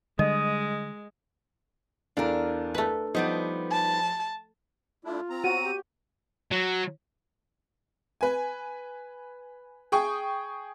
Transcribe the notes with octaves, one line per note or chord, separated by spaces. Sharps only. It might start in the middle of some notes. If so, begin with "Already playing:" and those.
D3 G3 G#3 D#5 D#6
E2 D4 A4 A#4 F5
A3 B4
F3 G3 B3 D#4
A5
A3 D4 E4 F4
C4 A#5
F#4 D#7
G4
F#3
B4 G#5
G#4 G5 C#6 D#6